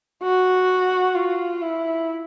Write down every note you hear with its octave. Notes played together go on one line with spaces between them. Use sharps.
F#4
F4
E4